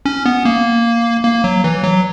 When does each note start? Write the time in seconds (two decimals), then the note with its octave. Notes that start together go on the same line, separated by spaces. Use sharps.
0.06 C#4
0.26 B3
0.45 A#3
1.24 A#3
1.44 F#3
1.64 E3
1.84 F#3